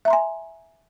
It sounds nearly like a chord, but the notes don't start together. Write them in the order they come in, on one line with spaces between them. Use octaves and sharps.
E5 A#5 C6 G#5